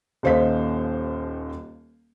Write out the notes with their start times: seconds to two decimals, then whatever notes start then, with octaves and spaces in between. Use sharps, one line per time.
0.23 D#1 D#2 C5 D#5 F5 B6